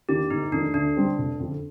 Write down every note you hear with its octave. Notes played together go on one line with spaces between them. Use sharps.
D#3 A#3 D4 G4
G1 D#4
F2 D#3 A3 D4
D2 D4
D3 G3 C4
F1
F2 D3